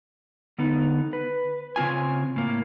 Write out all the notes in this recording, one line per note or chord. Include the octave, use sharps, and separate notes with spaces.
D3 B3 D#4
B4
C#3 C4 F4 G#5
A2 A#3